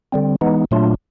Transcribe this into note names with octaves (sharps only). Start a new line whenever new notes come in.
D3 G3 C4
E3 G#3 B3 D#4
A#2 F#3 A3 D4 F4